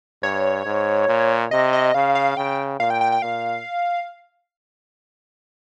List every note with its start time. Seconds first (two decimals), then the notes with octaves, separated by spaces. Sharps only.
0.23 G2 C#5
0.66 G#2
1.08 A#2
1.51 C3 D#5
1.73 D#5
1.94 C#3 F5
2.15 F5
2.37 C#3 G5
2.79 A#2 F5
2.90 G5
3.01 G5
3.12 G5
3.22 A#2 F5